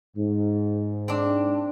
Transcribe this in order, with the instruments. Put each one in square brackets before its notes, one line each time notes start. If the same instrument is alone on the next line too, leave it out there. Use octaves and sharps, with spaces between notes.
[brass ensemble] G#2
[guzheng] C4 D4